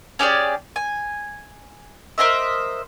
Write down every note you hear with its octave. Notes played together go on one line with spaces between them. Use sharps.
C#4 G4 G#4 D5
G#5
A#4 C5 D#5 E5